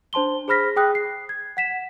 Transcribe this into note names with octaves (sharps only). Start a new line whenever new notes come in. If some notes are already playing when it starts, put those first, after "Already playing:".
D4 C5 A5 C6 G7
G#4 C5 B5 F6 A#6 B6
G#4 G5 D#6 F#6
C7
G#6
F#5 B6 E7